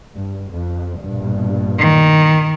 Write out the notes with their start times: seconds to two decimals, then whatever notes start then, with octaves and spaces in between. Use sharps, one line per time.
0.17 G2
0.51 F2
1.01 A#1 G2 B2
1.79 D#3